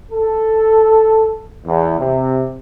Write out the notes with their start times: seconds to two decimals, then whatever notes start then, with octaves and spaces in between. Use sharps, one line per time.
0.12 A4
1.65 E2
1.99 C3